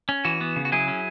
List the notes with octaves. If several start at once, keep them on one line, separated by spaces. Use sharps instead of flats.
C#4
E3 F#4
B3
C#3
F#4
F#3 E4 G#4
C#4